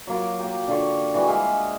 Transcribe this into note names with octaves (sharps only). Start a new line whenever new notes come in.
F#3 A#3 F4
A#3 G4
D3 F4 C#5
E3 G3 F#4 G#4
G#3 G#4 E5 F5